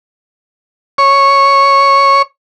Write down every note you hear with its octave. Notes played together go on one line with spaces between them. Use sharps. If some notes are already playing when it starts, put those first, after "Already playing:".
C#5 C#6